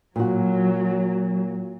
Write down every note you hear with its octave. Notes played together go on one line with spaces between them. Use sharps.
A#2 F#3 F#4